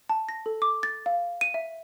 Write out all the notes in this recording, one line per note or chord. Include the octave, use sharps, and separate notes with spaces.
A5
A#6
A4
D6
A6
F5
D#7
E5